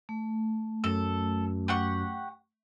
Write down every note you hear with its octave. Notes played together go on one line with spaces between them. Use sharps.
A3
F#2 A4
G4 F#5 C#6